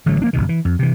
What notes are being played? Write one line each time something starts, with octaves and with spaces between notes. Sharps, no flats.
A1 D3 F#3 A3
F3 A#3 D4
F#1 C2 C3 D#3
E3
F2
C3 E3